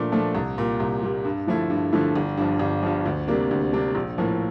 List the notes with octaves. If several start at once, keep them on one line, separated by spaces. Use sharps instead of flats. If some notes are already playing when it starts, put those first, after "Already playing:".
Already playing: A#2 F3 A3 D4
F3 A3 D4
C2
A#2 G3
C2
A#2 G3
G2
D3 F3 A3 E4
G2
D3 F3 A3 E4
G1
G2 F3
G1
G2 F3
D2
C3 G3 A#3 D4
D2
C3 G3 A#3 D4
A#1
A2 F3 A#3